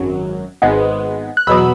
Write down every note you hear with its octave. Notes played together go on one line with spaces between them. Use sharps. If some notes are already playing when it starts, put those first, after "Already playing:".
Already playing: G#1 F#2 F#3
G#1 G#2 G#3 B3
F#6
E2 B2 F#3 B3 B5 E6